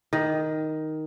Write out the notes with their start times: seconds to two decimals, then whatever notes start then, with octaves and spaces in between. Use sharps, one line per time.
0.13 D#3